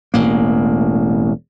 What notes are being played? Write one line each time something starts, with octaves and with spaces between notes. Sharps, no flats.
E1 A1 A#3